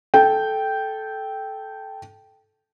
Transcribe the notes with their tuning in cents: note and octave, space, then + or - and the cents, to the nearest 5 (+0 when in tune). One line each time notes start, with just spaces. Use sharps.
A4 -15 G5 -5